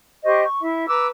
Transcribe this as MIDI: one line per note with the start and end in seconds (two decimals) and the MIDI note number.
0.24 0.42 67
0.24 0.42 72
0.24 0.42 75
0.24 0.42 85
0.43 0.59 85
0.60 0.85 64
0.60 0.85 76
0.87 1.06 71
0.87 1.06 82
0.87 1.06 86
0.87 1.06 88